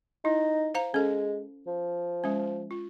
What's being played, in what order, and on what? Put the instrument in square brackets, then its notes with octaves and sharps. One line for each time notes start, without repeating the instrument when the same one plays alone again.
[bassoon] D#4 [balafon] E4
[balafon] C5 F5 A#5
[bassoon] G#3 [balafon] C#4 A4
[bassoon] F3
[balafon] G#3 C#4
F4